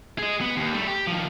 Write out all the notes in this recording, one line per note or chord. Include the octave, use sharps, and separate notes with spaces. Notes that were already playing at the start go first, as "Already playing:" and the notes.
G#4 D#5
B3
D#2
G3 A3
G4
D#3 F3